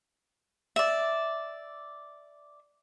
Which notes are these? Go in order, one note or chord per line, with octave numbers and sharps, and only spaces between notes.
D5 E5